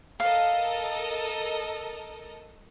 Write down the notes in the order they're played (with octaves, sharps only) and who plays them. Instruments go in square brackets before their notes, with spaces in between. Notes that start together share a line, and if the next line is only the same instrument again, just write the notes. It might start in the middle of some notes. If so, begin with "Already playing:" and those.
[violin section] A4 A#4 D#5 [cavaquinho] F5